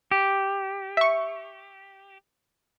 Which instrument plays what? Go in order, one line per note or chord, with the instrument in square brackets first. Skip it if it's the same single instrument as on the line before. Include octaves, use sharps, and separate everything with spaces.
[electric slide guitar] G4
[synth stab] E5 C#6